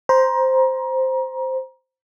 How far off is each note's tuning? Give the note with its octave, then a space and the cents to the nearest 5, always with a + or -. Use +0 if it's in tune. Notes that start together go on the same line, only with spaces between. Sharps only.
C5 +0 A#5 +30